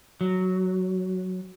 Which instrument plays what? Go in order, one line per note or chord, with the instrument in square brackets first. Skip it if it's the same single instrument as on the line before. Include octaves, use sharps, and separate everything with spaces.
[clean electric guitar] F#3